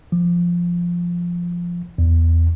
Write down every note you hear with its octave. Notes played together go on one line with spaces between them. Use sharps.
F3
E2